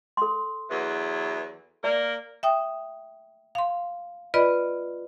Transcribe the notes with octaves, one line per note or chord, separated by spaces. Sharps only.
A4 C6
E2 E3 F#3
A#3 A#4 D5
E5 G5 D#6
F5 C6
F4 B4 D5 D#5 B5